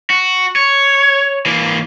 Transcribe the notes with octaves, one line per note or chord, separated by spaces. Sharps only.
F#4
C#5
E3 A#3